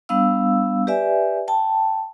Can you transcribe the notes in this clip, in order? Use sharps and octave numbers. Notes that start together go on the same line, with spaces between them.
G3 B3 D4 F5 E6
G4 B4 D5 E5 G#5
G5 A5